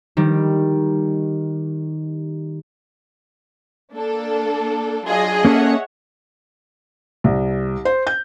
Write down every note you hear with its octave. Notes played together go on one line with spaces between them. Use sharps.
D#3 G3
A#3 D4 A4
F#3 D4 F4 G#4 D#5
A#3 C#4 A4 C#5 E5 F#5
C2
C5
G6